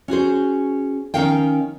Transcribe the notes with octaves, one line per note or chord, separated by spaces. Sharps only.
C#4 F#4 G#4 C5
D#3 A3 C#4 A#4 F5 G5